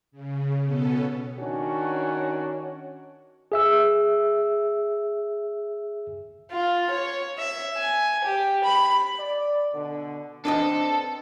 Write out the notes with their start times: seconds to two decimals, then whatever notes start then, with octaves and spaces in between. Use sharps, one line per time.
0.12 C#3
0.64 B2 B3 C#4 A4
1.39 D#3 C#4 D4 F#4
3.52 G#4 E5 E6
6.51 F4
6.90 C#5
7.38 E5
7.76 G#5
8.24 G4
8.64 B5
9.18 D5
9.73 B2 D3
10.45 C4 D4 A4 B4 D#5